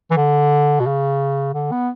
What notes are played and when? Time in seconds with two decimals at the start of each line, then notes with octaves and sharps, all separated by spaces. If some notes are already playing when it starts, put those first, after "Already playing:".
0.11 E3
0.17 D3
0.80 B2
0.86 C#3
1.54 D3
1.71 B3